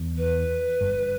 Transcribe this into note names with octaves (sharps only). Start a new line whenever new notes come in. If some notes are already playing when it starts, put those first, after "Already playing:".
Already playing: E2
B4
G1 G2